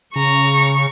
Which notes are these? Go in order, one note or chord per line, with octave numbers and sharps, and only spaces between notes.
C#3 A#5 C#6